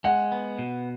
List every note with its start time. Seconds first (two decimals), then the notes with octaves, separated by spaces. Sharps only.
0.04 G#3 F#5
0.32 B3
0.58 B2